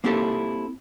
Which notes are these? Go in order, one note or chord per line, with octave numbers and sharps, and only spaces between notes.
A#3 C4 E4 G4 A4